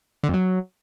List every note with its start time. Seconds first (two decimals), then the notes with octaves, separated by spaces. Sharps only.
0.23 D3
0.29 F2
0.34 F#3